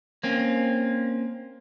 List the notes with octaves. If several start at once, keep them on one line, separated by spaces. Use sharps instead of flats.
A#3 C4 C#4